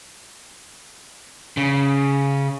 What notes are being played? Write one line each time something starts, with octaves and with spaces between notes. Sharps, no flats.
C#3